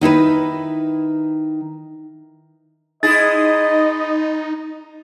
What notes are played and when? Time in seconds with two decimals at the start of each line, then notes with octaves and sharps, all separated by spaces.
0.01 D#3 D#4 E4 B4
3.03 G#3 D#4 E4 G#4 D#5 A6